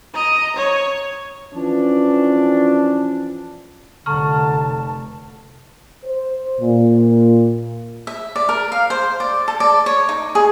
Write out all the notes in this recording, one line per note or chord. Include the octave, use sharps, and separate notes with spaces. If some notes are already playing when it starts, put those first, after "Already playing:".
D#5 A#5
C#5
E3 F3 C#4 D4
F1 D3 A5 A#5 C#6 F6
C5
A#2
E5
D5
A#4
F5
C5
D5
A4
D5
C#5
D#4
G#4